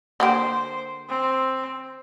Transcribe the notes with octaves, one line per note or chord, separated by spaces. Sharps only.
D3 A#3 G4 C5
C4